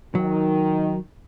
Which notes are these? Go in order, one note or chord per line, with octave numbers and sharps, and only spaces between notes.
D#3 F#3